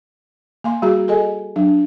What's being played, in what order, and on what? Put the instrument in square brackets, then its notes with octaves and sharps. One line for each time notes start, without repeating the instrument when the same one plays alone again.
[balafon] A#3 F5 C6
G3 F#4 G#4 A#5
G#4 A4 D#5 G#5
F#3 D4